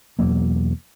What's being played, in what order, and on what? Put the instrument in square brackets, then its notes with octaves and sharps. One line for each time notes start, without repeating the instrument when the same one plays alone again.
[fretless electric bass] E2 B2 F#3 A#3